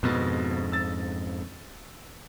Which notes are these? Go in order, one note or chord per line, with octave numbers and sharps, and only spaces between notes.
F2 G#2 B2
E6 A6